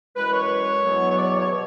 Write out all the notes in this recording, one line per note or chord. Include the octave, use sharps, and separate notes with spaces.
F#2 E3 G#3 B4
C#5
E2 B2 F#3 B3
C#5
D5
C#5
C#5
B2